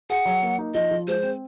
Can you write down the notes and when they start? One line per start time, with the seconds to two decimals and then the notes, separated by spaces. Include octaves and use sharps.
0.10 G#4 F#5
0.26 F#3
0.42 A#3
0.58 D#4
0.74 F3 D#5
0.91 F3
1.08 G#3 C5
1.23 C4